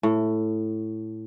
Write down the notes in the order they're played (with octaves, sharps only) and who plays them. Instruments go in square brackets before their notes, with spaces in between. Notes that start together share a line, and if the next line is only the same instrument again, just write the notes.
[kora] A2